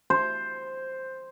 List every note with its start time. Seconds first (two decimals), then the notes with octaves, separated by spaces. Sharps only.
0.10 C5